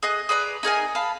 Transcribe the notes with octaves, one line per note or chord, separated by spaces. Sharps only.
G#4 D#5 F#6
G#4 B4 D5 A#5
D#4 G#4 A#4 G#5
F5 A5 B5